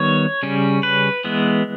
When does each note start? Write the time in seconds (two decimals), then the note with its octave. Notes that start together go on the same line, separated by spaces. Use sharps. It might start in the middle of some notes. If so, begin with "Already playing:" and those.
Already playing: D#3 G3 B3 C#5
0.43 C#3 G3 C#4
0.83 B4
1.24 E3 G#3 B3